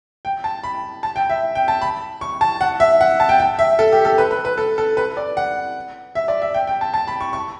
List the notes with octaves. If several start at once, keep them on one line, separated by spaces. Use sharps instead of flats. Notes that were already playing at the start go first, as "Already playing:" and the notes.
G5
A5
B5
A5
G5
E5
G5
A5
B5
C#6
A5
F#5
E5
F#5
A5
G5
G5
E5
A4
G4
A4
B4
B4
B4
A4
A4
B4
D5
F#5
E5
D5
E5
G5
G5
A5
A5
B5
C#6
C#6